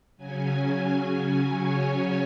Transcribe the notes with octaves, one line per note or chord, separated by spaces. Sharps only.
C#3 F#3 C#4 G#5
G#5
C#5
C#5